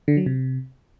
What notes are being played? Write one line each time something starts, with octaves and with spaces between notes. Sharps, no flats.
D3
F#3
C3